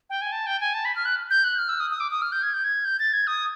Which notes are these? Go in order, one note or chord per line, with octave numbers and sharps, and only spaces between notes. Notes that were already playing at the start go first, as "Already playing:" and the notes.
G5
G#5
A5
G5
G#5
A5
B5
F6
F#6
G6
F#6
F6
E6
D#6
D#6
D6
D#6
F6
G6
G#6
G6
G#6
G6
A6
G#6
D#6